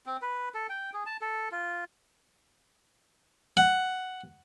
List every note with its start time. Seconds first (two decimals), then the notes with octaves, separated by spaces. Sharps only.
0.06 C4
0.22 B4
0.54 A4
0.69 G5
0.94 G#4
1.06 A5
1.21 A4
1.52 F4
3.57 F#5